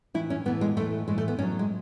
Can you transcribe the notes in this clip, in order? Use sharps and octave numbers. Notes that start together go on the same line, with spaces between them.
A2 E3 E4
C#4
A2 E3 B3
G#3
A2 E3 A3
A2 E3 G#3
A3
B3
A2 F#3 C#4
G#3